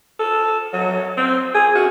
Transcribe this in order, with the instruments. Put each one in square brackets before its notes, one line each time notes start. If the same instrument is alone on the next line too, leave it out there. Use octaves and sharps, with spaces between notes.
[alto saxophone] A4
F#3
C4
G#4
F#4